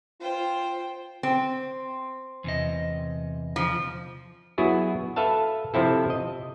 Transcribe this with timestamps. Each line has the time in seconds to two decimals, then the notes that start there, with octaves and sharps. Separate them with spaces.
0.21 F4 C5 G5
1.23 C4
2.44 E2 C3 D#5
3.56 F3
4.58 F#3 B3 E4 F#4 G#4
5.16 A4 B4 E5 F5 A5
5.74 C3 F3 C4 E4 A4
6.10 D#5